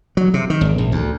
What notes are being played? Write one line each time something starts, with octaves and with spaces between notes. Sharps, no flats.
F#3
C3
D#3
G#1
A#1
D2